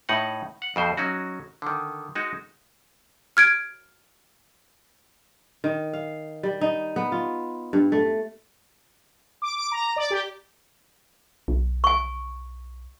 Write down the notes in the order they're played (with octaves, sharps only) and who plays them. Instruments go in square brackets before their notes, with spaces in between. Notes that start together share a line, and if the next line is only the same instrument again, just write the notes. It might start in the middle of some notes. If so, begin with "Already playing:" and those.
[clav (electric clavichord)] A2 D#4 F#5
F#5
F2 B2 C5
F#3 C#4 D#4 F#4
D3 D#3
G#3 D#4 F#4
[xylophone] F6 G#6 D7
[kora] D#3
F5
G3
D#4
B3
F4
G2
A3
[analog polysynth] D6
D6
A#5
D5
G4
[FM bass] B1
[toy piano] G#5 C#6